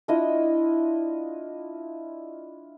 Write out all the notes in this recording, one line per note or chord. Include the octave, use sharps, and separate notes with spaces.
D4 E4 F4 D#5